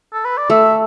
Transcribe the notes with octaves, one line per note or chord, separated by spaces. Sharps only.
A4
B4
D5
A3 E5